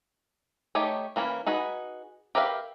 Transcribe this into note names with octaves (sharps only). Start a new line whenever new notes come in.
A3 D#4 G4 C#5
E3 A#3 C#4 B5
D#4 F#4 G#4 B4
G4 A#4 B4 E5 F5